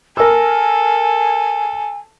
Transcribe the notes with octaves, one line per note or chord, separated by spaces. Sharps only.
A4 A#4 G#5 E6